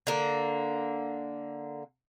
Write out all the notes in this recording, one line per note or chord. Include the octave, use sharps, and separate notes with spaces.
D3 A#3